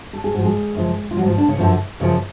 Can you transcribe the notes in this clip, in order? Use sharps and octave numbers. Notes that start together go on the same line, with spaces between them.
A4
G#4
G#2 F3 F#4
G#3 G#4
F#2 C#3 F3
F4
F3 F#3 F#4
G#2
F3 F4
D3 D4
C#3 C#4
F#2 D3 F3
F#2 C#3 F3